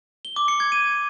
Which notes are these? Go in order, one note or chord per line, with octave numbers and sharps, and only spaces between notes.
G7
D6
C#7
G#6
D#7